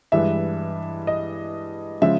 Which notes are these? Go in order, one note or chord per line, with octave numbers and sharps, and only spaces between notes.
G2 E3 G#3 E5
D#5
C#3 F3 G#3 E5